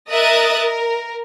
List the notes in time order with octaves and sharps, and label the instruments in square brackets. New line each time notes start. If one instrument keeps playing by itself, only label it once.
[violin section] A#4 D#5 E5 D#6 F#6 A6
A#4